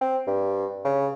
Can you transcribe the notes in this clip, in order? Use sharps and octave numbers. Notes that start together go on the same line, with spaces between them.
C4
G2
C#3